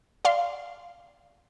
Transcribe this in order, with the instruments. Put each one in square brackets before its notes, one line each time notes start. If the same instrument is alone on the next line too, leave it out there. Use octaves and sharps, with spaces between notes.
[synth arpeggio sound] D5 F5 C6